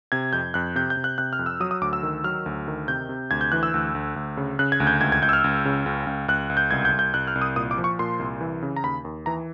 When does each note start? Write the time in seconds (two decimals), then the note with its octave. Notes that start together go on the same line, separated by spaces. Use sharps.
0.12 C3 G#6
0.33 F2 G6
0.54 F2 F#6
0.76 C3 G6
0.90 G6
0.97 C3
1.04 F#6
1.18 C3 F#6
1.33 F6
1.39 F2
1.46 E6
1.60 F#3 D#6
1.71 D#6
1.81 D2 D6
1.93 E6
2.03 D#3
2.24 F#3 F6
2.46 D2
2.68 D#3
2.88 C3 G6
3.09 C3
3.31 D2 G#6
3.41 G6
3.52 E3 F#6
3.63 E6
3.74 D2
3.95 D2
4.16 D2
4.37 C#3
4.59 C#3 F#6
4.72 G#6
4.80 D2
4.87 G6
5.01 C#2 G#6
5.12 G#6
5.22 C#2 G6
5.29 E6
5.33 F6
5.44 C#2
5.65 C#3
5.86 C#2
6.07 C#2
6.28 C#2 F#6
6.50 C#2
6.57 G6
6.71 C2 G#6
6.85 G6
6.92 C2
6.99 G6
7.14 C2 F#6
7.27 F6
7.35 C2
7.42 D#6
7.56 A#2 D#6
7.71 D6
7.78 F3
7.84 C#6
7.99 A#2 C6
8.19 C2
8.41 E3
8.62 C#3
8.76 A#5
8.83 D#2 B5
9.05 D#2
9.26 E3 A#5